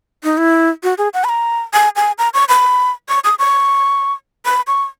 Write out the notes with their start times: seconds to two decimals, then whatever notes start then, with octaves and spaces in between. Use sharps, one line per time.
0.23 D#4
0.38 E4
0.83 F#4
0.98 G#4
1.14 F#5
1.24 B5
1.29 A#5
1.73 G#5
1.96 G#5
2.19 A#5
2.34 C#6
2.49 B5
3.09 C#6
3.24 D#6
3.39 C#6
4.46 B5
4.67 C#6